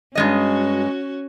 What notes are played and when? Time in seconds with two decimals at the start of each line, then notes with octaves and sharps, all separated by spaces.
0.15 G2 G#3 C#4 F#4 D#5